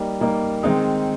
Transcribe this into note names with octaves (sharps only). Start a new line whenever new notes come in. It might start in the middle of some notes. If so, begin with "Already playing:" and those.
Already playing: G3 A#3 D#4
G3 A#3 D#4
D#3 G#3 C4 D#4 G#4